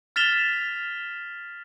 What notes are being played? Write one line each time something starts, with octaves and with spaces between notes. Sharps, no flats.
F6 A6 B6 E7 F7 G7